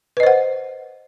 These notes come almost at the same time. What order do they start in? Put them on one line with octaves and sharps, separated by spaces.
B4 D#5 C5 F#5